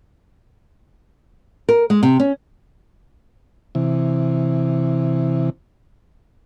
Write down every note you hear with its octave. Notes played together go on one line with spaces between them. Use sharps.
A#4
G#3
C3
C#4
C3 E3